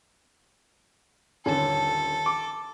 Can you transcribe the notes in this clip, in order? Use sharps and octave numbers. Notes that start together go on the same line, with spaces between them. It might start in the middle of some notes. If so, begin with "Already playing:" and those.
D#1 D3 C#4 A4
D6